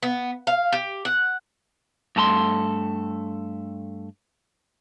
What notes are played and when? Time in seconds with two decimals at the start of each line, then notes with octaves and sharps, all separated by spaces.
0.03 B3
0.47 F5
0.72 G4
1.05 F#5
2.16 G2 A3 A4 A#5 C6